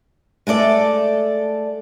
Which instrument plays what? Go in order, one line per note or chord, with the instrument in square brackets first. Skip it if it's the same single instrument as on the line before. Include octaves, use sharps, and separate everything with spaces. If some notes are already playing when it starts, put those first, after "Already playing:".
[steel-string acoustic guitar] G#3 A3 A4 D5